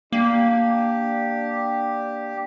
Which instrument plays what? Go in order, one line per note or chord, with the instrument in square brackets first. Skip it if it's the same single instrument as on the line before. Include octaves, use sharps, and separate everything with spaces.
[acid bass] A#3 [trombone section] D4 [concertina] G4